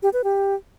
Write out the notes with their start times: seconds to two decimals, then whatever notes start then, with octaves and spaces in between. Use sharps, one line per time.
0.03 G4
0.13 B4
0.24 G4